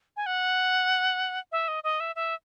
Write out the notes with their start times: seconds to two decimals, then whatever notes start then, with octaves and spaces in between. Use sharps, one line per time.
0.17 G#5
0.26 F#5
1.52 E5
1.68 D#5
1.84 D#5
2.00 E5
2.16 E5